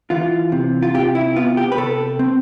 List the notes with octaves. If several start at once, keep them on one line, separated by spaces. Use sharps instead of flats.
E3 F4
C3
F4
C3 G4
E4
B3 F4
G4
B4
C3 A4
C4